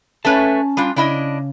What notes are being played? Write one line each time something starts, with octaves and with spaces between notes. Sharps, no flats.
A3 C#4 B4 C#5 A5
G3 D4 F4
C#3 D4 E4 D#5